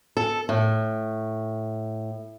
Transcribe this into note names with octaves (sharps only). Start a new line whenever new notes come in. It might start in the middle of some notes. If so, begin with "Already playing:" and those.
A4
A2